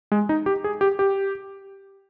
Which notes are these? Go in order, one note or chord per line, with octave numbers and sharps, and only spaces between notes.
G#3
D#4
G4
G#4
G4
G4